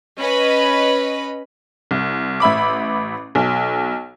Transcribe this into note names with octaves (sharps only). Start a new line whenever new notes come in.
C#4 B4 D#5 B5
C2
A1 E5 B5 D6
B1